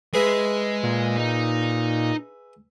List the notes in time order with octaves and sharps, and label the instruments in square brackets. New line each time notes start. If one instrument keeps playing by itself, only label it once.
[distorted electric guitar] G#3 [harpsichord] G#4 B4 E5
[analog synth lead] A#2
[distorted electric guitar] D#4